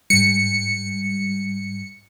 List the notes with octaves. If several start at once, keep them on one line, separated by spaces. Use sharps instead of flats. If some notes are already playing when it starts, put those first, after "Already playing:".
G#2 G3 C#7